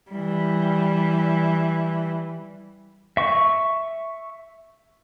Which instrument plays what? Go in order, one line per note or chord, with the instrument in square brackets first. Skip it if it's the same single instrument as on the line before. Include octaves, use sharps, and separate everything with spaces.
[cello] E3 G3
[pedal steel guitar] E5 C#6